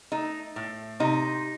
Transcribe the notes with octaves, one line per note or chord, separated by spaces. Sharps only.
A3 D#4
A2
C3 D#4